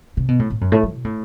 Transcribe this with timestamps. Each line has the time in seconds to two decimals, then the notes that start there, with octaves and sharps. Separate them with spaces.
0.17 C3
0.28 B2
0.39 A2
0.50 A2
0.61 F#2
0.72 A2
0.83 F#3
0.94 B2
1.04 A2